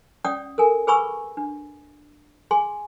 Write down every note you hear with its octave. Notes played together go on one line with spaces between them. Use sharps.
C#4 D5 F#5 G5 D#6
A4 A#4 G#5
G#4 B4 G#5 B5 C#6 E6
D4
G#4 G#5 C6